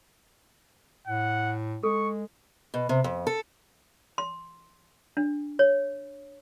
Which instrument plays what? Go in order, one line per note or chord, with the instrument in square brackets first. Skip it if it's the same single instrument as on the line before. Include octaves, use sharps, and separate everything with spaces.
[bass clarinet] A2 [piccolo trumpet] F#5
[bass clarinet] G#3 [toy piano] A4 [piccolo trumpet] C#6
[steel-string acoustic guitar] B2
C3
F2
A4
[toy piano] C6
D4
C#5